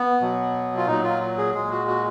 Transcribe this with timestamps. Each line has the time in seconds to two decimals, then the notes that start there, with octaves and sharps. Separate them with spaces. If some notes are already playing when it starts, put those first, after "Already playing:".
Already playing: B3
0.21 B2 F#3
0.77 F4
0.87 A#2 F#3 D#4
1.04 F4
1.38 G#4
1.54 A#2 G#3 G#4
1.71 F#4
1.87 F#4